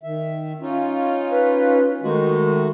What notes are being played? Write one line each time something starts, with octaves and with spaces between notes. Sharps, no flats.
D#3 E5
C#4 D#4 F4
B4
D#3 G#3 A3 D#4 F#4